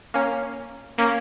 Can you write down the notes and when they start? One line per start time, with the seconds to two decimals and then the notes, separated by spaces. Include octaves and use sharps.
0.14 A#3 C#4
0.98 A#3 C#4